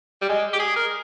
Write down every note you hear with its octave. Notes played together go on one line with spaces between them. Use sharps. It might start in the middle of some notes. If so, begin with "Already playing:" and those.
G3
G#3
G4
G#4
A#4